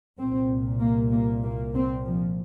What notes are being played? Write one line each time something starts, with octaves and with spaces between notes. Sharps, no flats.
C2 A#2 C4
A#3
A#3
A#3
C4
F3